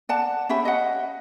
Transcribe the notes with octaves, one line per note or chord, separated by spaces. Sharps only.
D5 F#5 A5
C#4 G4 E5 B5
D#5 F#5